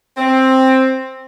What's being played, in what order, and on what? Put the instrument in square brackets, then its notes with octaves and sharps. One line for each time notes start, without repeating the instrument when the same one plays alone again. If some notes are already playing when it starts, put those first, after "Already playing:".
[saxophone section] C4